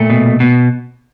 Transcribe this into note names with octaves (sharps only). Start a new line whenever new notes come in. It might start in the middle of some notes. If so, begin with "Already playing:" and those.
Already playing: A#2 A3
B2
B2